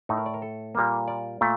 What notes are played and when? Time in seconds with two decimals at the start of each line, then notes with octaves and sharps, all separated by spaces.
0.09 A2 A3 D#4
0.18 A#4
0.26 D5
0.34 A#4
0.42 A4
0.75 A#2 G3 A#3
1.08 D5
1.41 A#2 A3